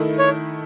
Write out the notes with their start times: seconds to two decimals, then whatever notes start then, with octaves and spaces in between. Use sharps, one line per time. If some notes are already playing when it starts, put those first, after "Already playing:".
Already playing: D#3 A3 E4
0.19 C#5